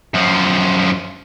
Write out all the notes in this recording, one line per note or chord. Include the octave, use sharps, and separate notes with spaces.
F#2 F3